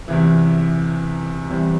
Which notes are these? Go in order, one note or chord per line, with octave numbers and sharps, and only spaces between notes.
E2 C3 E3
E2 E3 G3 C4